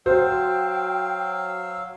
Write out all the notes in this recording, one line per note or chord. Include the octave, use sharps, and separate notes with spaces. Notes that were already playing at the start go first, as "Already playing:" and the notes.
F#3 F#4 C5 F5 G5 E6